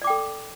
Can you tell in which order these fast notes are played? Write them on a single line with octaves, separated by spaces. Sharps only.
D5 D6 G5 A4